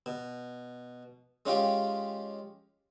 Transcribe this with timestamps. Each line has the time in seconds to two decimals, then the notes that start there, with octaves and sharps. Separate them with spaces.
0.06 B2
1.46 G#3 C#4 F4 G4 F5 G5